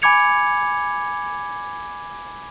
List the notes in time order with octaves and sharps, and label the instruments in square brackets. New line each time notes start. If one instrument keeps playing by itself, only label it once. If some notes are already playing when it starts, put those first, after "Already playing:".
[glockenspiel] G#5 B5 D6 G#6 C#7 F7